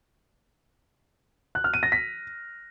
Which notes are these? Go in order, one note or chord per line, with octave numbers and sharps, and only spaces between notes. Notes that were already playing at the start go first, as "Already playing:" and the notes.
F#6
F6
D#7
A#6
B6